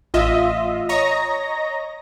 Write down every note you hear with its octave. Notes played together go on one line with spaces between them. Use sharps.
A1 F4 D#5 E5
C#5 D#5 A#5 A#6